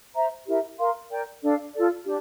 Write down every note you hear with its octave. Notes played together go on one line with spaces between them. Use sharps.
C5 E5 A#5
E4 G4 A#4 E5
A#4 F5 C6
A#4 D5 G5
D4 A4 D5 F5
F4 A4 D5
D4 G4